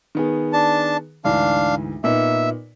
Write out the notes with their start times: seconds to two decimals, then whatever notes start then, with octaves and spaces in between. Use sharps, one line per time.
0.15 D#3 B3 G#4
0.53 D4 A5
1.25 D2 G#2 E3 D4 F5
2.04 A#2 B3 D#4 E5